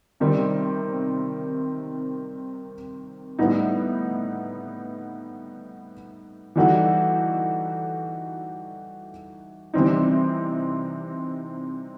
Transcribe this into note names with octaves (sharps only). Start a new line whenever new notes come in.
C3 D#3 G3 C4 D#4
A2 G3 B3 D#4
E3 G3 D#4 F#4 A4
C3 E3 G3 C4 D#4